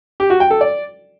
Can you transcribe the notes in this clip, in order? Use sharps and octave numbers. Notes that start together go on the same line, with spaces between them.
G4
F#4
G5
A4
D5